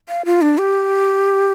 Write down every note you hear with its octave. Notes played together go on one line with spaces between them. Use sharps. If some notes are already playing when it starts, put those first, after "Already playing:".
F5
F4
D4
G4